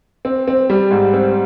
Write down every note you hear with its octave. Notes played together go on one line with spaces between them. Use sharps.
C4
C4
G3
G#2
C4